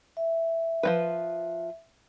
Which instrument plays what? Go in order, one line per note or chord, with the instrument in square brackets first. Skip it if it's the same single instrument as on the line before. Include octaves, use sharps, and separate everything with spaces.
[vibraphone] E5
[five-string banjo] F3 F#3 B4